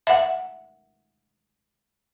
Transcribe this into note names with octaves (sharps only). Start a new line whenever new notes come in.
E5 F#5